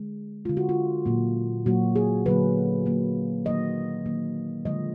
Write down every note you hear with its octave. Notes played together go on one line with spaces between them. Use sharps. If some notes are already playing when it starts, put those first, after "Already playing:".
Already playing: D3 G#3
D3 G#3 F4
F#4
F4
A#2 F#3 A#3
A#2 F#3 A#3 F#4
G#4
D3 F#3 A#3 B4
D3 F#3 A#3
D#3 F#3 A#3 D#5
D#3 F#3 A#3
D3 F3 G#3 D#5